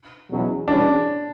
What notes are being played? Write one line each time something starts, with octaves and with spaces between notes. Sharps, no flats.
E2 B2 F#3 C#4 E4
E2 B2 G3 C#4 D4